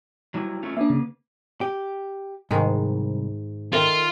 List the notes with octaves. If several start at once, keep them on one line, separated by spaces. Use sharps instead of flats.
F#3 G3 E4
A3 C#4 F4
A#3 D4 B4 E5
C#3
G4
C2 G#2 D#3 G#3
D#3 F4 A4 A#4 E5